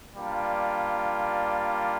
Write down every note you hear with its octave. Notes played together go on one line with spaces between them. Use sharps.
G3 A#3 D4 F4